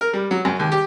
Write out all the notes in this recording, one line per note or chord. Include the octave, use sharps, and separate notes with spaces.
A#4
G3
F#3
F#2
D#2
G4